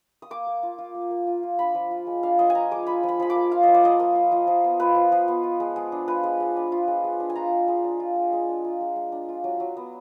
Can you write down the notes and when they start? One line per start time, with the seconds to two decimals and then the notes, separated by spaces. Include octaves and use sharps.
0.22 D#6
0.30 A#3 D6
0.47 A#3
0.63 F4
0.78 F4
0.95 A#3
1.11 A#3
1.27 F4
1.43 F4
1.59 D4 B5
1.75 F3
1.91 F4
2.07 G#3
2.23 D4 F5
2.39 F3 D#5
2.50 G#5
2.55 F4 A#5
2.71 G#3 D6
2.87 F4 B5
3.03 F3
3.08 B5
3.20 F3 B5
3.30 D6
3.35 A#3
3.52 F4 F5
3.63 F3 D#5
3.74 D5
3.84 F3 D#5
3.99 A#3
4.15 F4
4.32 F3
4.47 F3
4.64 B3
4.80 F4 B4
4.95 F3
5.12 F3
5.28 B3
5.43 F4
5.60 G#3
5.76 G#3
5.92 D4
6.08 F4 B4
6.23 G#3
6.40 G#3
6.57 D4
6.72 F4
6.88 G#3
7.04 G#3
7.20 D4
7.30 G#5
7.35 F4 A#5
7.52 G#3
7.68 G#3
7.84 D4
8.00 F4
8.16 G#3
8.33 G#3
8.49 D4
8.64 F4
8.81 G#3
8.96 G#3
9.12 D4
9.29 F4
9.44 F#3
9.60 F#3
9.77 B3